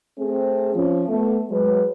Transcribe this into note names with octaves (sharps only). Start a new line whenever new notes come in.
A3 C4 G#4
F3 C#4
A3 B3
F#3 G#3 B4